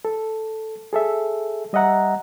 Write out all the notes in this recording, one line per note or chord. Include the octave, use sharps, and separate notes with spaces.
A4
G#4 A4 E5
G3 D#5 E5 F#5 A#5